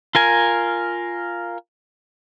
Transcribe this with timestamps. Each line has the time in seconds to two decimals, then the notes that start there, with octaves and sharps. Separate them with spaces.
0.15 F4 A#4 G#5